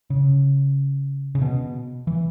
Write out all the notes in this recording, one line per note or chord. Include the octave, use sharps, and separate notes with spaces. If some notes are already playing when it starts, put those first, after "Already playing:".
C#3
C#3
B2
E3